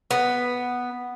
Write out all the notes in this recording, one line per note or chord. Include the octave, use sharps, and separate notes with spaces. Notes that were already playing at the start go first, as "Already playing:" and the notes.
B3